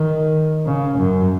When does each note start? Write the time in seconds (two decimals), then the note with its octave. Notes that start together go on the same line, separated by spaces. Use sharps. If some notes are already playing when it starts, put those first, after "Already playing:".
Already playing: D#3
0.66 C#3
0.98 F#2